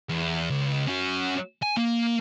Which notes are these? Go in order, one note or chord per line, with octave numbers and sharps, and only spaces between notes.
E2
C#2
C#4 F#4
G#5
A#3